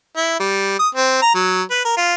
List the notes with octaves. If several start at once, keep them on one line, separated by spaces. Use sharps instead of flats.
E4
G3
D#6
C4
A#5
F#3
B4
A#4
F4